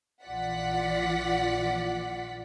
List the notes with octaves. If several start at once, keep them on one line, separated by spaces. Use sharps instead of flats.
A#1 E3 F4 D5 F#5 B6